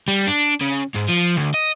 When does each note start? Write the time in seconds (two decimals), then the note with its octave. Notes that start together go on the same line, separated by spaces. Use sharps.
0.08 G3
0.27 D4
0.61 C#3
0.95 G#2
1.08 F3
1.36 D2
1.54 D#5